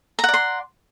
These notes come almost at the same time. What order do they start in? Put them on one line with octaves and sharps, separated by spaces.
A#5 F#5 D5 C6